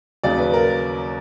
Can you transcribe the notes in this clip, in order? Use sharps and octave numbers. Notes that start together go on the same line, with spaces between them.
D#2 C#3 F#3 D5
B4
A#4